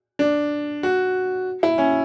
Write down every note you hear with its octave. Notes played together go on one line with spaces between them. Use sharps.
D4
F#4
E4
C#4